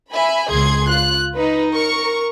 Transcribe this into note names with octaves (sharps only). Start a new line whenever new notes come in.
E5 G#5 B5
C#2 G#4 C6 G#6
F4 F#6
D#4 B4
A#4 C#6